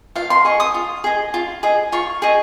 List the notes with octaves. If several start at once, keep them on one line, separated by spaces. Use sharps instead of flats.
F4 F5
C6
G#4 D#5 C#6
D#6
F4
G#4 D#5
F4
G#4 D#5
F4 C#6
G#4 D#5